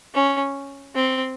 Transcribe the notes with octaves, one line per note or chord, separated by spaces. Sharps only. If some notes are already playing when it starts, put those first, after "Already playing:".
C#4
C4